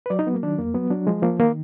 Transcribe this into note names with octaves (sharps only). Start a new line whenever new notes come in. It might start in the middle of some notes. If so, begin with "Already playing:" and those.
B4
F#3 D5
D#4
F#3 B3
A#3
D#3 D4
F2 A#3
F#3 B3
F#3 D4
F3 G#3
F3 A#3
D#3 A#3